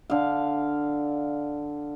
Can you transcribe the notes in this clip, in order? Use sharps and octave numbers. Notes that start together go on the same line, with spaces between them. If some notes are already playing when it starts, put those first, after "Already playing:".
D3 F5